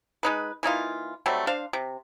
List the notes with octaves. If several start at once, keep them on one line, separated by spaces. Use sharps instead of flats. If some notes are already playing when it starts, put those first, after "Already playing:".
G#3 D#4 B4
E3 A#3 D#4 F4
F#3 G3 A3 C4
D4 C5 F5
C3